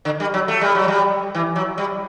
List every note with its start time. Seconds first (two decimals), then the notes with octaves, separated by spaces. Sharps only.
0.05 D3
0.20 G3
0.34 F#3
0.48 A3
0.61 G3
0.75 F#3
0.88 G3
1.35 E3
1.56 F#3
1.78 G3